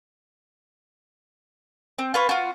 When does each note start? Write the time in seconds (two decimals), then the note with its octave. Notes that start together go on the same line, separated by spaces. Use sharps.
1.99 C4
2.14 F4 B4 C#5
2.29 F4 F#4